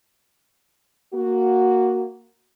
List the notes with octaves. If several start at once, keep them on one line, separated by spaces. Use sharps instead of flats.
A#3 F#4